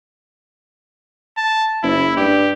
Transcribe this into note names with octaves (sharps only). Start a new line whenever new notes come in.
A5
F#1 E4
G2 G4